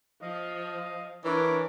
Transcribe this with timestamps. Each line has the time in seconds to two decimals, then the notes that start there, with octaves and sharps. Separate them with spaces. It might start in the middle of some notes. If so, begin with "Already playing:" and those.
0.22 F3 D#5 F5
1.24 E3 D4 A#4 C#5 D6